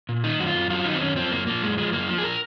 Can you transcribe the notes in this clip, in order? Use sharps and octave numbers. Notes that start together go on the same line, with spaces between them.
A#2
D#3 D#4
F#2 F#4
F4
F#2
F#3 F4
D#3 D#4
C4
F#2 C#4
F3 C4
F#2 A#3
F3 A#3
F#2 G#3
F3 G#3
F#2 A#3
F3
G#4
A#4